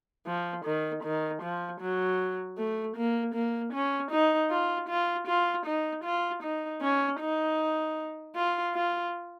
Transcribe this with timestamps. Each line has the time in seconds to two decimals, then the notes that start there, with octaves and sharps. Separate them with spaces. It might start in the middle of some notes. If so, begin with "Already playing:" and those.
0.27 F3
0.65 D#3
1.04 D#3
1.42 F3
1.81 F#3
2.58 A3
2.96 A#3
3.35 A#3
3.73 C#4
4.12 D#4
4.51 F4
4.89 F4
5.28 F4
5.66 D#4
6.04 F4
6.43 D#4
6.82 C#4
7.20 D#4
8.35 F4
8.75 F4